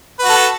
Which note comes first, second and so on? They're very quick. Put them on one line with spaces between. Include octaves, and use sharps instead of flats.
B4 F#4 A4